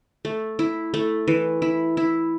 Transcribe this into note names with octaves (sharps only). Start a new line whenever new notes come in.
A3
E4
A3
E3
E4
E4